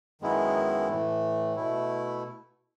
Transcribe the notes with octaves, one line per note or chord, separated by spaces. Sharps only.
F#2 D#3 G#3 B3 E4
A2 E3 A3
B2 A3 E4